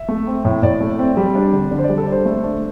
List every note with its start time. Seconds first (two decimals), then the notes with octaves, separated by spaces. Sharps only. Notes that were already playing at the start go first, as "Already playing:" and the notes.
Already playing: E5
0.08 A3
0.27 C4
0.45 A2
0.63 A2 D5
0.81 A3
0.99 C4
1.17 G3
1.35 D4
1.53 D3
1.71 D3
1.78 C5
1.84 D5
1.89 G3
1.98 A4
2.07 D4
2.12 C5
2.25 A3
2.44 D4